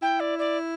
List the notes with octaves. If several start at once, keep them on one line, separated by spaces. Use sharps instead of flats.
E4 G5
D5
D5